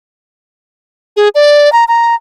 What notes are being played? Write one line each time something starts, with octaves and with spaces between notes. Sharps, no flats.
G#4
D5
A#5
A#5